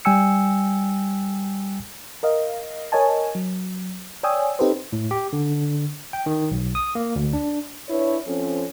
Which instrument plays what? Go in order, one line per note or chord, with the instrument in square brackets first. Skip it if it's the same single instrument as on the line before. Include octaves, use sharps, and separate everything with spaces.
[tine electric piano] G3 G5 G#5 E6 C#7
[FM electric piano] A#4 D#5 F5
A#4 C#5 D#5 G#5 A5
F#3
C#5 D5 G5 G#5 D#6 E6
C4 D#4 G4 A4 B4 C5
[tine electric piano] A2
G4
D3
G5
D#3
B1
D#6
A#3
D2
D4
[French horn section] D4 E4 B4 C#5
F3 C4 C#4 A4